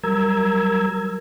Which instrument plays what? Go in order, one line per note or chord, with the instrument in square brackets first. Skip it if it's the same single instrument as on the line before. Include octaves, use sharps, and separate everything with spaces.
[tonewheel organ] F#3 G3 A#4 A#5 E6 G#6